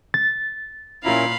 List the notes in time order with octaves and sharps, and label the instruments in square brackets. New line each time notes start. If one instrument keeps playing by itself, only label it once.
[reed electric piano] A6
[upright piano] A#2 F4 A#5 [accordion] C#4 E4 A#4 [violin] F5 B5